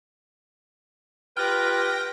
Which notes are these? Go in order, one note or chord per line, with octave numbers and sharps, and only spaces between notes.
F4 G4 B4 G5 F6 A#6